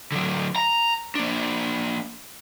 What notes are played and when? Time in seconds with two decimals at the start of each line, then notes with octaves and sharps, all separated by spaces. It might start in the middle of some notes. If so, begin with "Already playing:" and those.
0.12 D3 F#3
0.56 A#5
1.15 A#3 D4